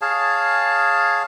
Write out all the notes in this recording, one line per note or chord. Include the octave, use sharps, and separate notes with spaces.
G#4 C#5 F5 A5